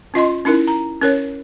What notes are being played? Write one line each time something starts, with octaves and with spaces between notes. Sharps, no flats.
C#4 F4 D#5 C6
C#4 D#4 E4 A#4
A#5
C#4 A#4 C#5